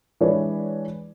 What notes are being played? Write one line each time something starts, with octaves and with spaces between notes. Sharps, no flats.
E3 G#3 D4 B4 C#5 D5